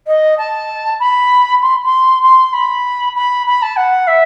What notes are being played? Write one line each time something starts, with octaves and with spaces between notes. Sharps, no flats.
D#5
A5
B5
C6
C6
C6
B5
B5
B5
A5
F#5
E5